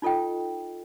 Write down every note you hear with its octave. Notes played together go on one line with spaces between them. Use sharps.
D#4 F4 A4 D#5 G5